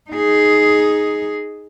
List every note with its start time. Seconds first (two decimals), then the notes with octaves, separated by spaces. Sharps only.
0.11 D#4 G#4